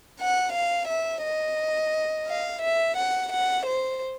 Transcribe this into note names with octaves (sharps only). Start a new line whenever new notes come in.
F#5
F5
E5
D#5
F5
E5
F#5
F#5
C5